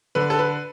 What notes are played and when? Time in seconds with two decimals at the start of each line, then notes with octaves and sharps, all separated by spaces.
0.15 D3 B4
0.30 A4
0.39 B4